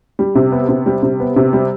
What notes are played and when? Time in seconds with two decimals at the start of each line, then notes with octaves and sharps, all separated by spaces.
0.19 G3
0.35 C3
0.52 B3
0.69 C3
0.86 G3
1.03 C3
1.20 B3
1.36 C3
1.53 G3